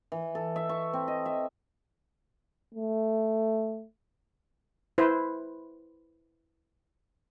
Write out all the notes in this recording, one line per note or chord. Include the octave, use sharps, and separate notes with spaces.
E3
A4
E5
C#6
C4
D#5
E5
A3
E4 B4 C5